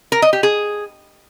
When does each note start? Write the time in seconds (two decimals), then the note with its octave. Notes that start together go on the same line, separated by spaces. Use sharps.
0.12 A#4
0.22 D#5
0.33 G4
0.43 G#4